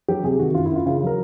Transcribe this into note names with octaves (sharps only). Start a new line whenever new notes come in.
F#3 G4
C3 G#4
D#3 F#4
F#2 F4
E4
F#2 F4
C#3 F4
F#3 A#4